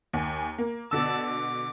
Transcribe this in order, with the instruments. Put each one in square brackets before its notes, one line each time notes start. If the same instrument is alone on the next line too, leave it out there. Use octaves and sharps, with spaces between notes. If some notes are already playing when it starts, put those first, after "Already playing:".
[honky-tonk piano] D#2 G#5
A#3
[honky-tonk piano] B2 D3 E6 [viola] D5 A5
[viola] D6